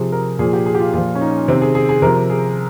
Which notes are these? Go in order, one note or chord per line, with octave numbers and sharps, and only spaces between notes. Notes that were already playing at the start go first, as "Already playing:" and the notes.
Already playing: C3 F3 G#4
A#4
A#2 F3 G#4
G4
G#4
G4
F4
A#2 F3 F4
C#4
D#4
C3 D#3 C4
G#4
G#4
G#4
C3 F3 A#4
G#4